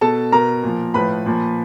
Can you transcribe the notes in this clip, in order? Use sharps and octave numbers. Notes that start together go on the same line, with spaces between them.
B2 A4 A5
B2 A#4 A#5
A#2 F3
A2 F3 B4 B5
A#2 F3